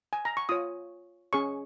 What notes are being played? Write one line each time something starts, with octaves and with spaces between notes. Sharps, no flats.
G#5
A#5
C#6
F4 C#5 D#6
C#4 G#4 C#5 C#6